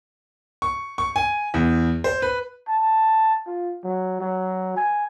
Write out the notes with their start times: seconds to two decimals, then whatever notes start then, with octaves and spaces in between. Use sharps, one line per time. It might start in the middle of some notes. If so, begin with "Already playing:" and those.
0.62 C#6
0.98 C#6
1.16 G#5
1.54 E2
2.04 C5
2.22 B4
2.68 A5
3.46 F4
3.84 F#3
4.20 F#3
4.76 G#5